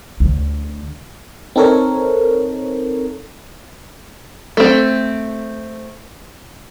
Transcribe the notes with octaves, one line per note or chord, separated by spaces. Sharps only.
D2
C4 D#4 A4 A#4 C#5
A3 C4